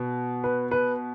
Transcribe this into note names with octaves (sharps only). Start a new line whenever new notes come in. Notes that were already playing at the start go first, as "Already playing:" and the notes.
Already playing: B2
B4
B4